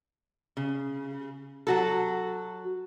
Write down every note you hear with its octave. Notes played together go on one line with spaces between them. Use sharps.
C#3
F#3 F#4 A4